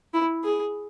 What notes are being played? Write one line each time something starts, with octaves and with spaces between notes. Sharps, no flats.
E4
G#4